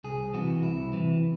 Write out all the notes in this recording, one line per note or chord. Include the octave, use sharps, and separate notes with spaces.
C2 G#4
C3 E3 F#4
C2 E4
C3 E3